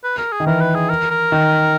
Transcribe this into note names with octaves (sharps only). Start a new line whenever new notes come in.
B4
A#4
G#4
D#3
E3 A#4
B4
G#4
A#4
A#4
D#3